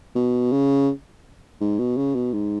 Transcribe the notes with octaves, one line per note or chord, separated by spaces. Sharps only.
B2
C#3
G#2
B2
C#3
B2
G#2